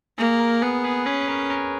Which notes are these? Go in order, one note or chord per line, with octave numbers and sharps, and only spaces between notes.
A#3 G#4
A#4
B3 G#4 B4
G#4 B4
C#4 G#4 B4
B4
A#4 C#5
A#4 C#5